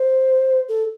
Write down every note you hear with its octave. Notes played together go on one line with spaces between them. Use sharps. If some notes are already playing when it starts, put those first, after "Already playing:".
Already playing: C5
A4